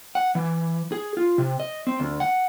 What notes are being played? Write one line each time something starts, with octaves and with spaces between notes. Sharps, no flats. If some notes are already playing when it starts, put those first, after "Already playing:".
F#5
E3
G#4
F4
C3
D#5
C4
D2
F#5